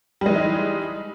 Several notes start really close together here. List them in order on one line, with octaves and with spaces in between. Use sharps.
G3 G#3 E3 D#4